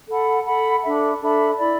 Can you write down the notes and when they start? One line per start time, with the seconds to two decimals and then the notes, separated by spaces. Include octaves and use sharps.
0.09 A4 F#5 B5
0.46 A4 F#5 B5
0.84 D4 A4 E5 B5
1.21 D4 A4 E5 B5
1.57 E4 D5 B5